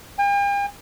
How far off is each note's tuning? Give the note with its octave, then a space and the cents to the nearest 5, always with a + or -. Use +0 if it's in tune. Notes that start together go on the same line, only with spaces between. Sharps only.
G5 +45